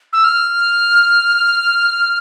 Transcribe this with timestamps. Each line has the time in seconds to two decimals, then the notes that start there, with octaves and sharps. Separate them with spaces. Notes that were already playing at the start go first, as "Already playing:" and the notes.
0.13 E6
0.24 F6